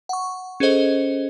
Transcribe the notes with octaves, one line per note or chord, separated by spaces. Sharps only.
F#5 C#6
C#4 G#4 A4 C5 D#5